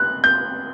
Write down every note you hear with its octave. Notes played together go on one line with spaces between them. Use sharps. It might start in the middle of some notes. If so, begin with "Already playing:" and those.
Already playing: F#6
G6